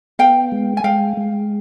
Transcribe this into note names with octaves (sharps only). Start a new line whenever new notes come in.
B3 F5 G5
G#3
G#5
G#3 F5 G5
G#3